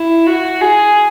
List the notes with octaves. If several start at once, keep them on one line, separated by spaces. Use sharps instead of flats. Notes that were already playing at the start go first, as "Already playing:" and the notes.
Already playing: E4
F#4
G#4